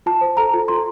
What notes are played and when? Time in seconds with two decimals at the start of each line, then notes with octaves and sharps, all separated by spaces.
0.06 F4 A5
0.21 C5
0.37 A4 A#5
0.54 F4
0.68 F4 C6